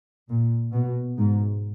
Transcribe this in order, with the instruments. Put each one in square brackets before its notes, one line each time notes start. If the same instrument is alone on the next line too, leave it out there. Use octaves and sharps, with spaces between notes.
[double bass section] A#2
B2
G#2